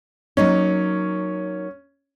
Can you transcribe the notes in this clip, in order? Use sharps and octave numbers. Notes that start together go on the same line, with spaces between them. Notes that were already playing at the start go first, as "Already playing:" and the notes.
F#3 A#3 C#4 D#4